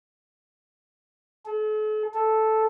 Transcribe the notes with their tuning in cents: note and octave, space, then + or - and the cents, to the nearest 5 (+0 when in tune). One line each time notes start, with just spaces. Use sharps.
A4 -45
A4 -5